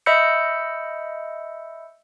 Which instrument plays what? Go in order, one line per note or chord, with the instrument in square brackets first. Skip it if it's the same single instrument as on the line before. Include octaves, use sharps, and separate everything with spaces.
[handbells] D#5 E5 B5 E6 G6 C#7